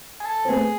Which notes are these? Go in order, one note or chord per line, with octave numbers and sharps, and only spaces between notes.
G#4
A4
C4
A3 B3 G#4